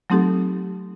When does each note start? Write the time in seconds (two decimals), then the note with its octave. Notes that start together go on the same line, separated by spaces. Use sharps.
0.10 F#3 A3 C4 D#4 G4 A4